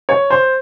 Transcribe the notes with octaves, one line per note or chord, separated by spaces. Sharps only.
C#5
C5